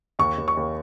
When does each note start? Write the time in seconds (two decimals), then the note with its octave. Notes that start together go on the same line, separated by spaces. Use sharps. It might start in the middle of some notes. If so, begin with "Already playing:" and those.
0.19 D#2 C#6
0.38 D#2
0.48 C#6
0.57 D#2